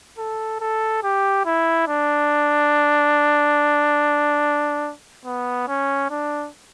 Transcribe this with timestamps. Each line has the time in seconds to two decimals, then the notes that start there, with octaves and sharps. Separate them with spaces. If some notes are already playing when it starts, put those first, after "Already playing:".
0.18 A4
0.60 A4
1.03 G4
1.46 E4
1.88 D4
5.25 B3
5.68 C#4
6.10 D4